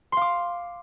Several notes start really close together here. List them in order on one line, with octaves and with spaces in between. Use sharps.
C6 F5 D6